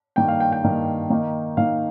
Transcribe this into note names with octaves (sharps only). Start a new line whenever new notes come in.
G2 D#3 A#3 G5
F5
G5
G5
G2 D#3 A#3
D#3 A#3 D#4
D#3 A#3 D#4 F5